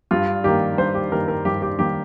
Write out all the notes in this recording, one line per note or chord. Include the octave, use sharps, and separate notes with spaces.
G2 F4
D#3 G3 A#3 G4
G2 C5
G4
D#3 G3 A#3 A#4
A#4
G2 G4
G4
D#3 G3 A#3 G4